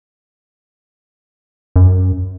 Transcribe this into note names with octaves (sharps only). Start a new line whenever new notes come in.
F#2